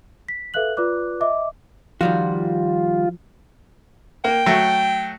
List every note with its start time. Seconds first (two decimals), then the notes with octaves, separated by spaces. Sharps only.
0.29 B6
0.54 A4 B4 E5 F5 F#6 F#7
0.77 F4 B4 D5 D6 F#6
1.21 D#5 E5 D6
2.01 D#3 F3 G3 F4 F#4
4.24 A#3 G5
4.46 F#3 A3